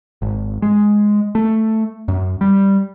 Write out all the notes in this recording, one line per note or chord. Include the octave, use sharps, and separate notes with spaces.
G#1
G#3
A3
F#2
G3